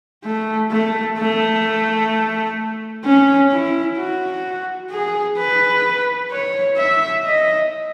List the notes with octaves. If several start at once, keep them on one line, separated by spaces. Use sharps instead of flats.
A3
A3
A3
C#4
E4
F#4
G#4
B4
C#5
E5
D#5